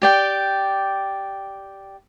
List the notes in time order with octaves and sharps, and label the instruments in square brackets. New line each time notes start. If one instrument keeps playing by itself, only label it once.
[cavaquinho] G4 D5 G5